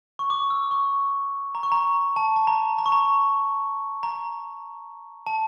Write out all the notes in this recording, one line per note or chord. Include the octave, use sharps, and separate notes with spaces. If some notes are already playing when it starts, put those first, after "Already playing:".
C#6
D6
E6
C#6
A#5
C#6
A#5
A5
A5
A#5
A#5
C#6
A#5
A#5
A5